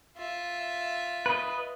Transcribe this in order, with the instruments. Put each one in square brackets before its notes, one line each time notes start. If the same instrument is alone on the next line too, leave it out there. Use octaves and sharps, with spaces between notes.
[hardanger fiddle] F4 E5
[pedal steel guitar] B4 D#5